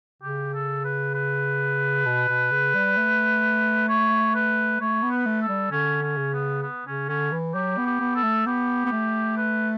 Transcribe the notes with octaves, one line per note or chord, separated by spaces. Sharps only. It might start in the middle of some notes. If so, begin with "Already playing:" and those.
C#3 G4
A4
B4
B4
B2
B2
C#3
G3
A3
C#5
B4
A3 C#5
B3
B4
A3
A4
G3
D3 C#4
C#4
C#3
B3
B3
C#3 C#4
D3 C#4
E3
F#3 G4
B3
G4
B3
A4
A3
B3 G4
B3
A3
B4